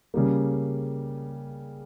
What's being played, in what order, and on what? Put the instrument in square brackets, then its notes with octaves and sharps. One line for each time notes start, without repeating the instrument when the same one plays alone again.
[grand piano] C#3 G3 A#3